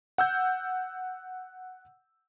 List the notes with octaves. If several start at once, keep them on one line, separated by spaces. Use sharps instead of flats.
F#5 E6 G6